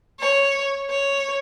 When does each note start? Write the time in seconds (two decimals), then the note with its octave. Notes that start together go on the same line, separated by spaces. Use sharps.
0.19 C#5
0.89 C#5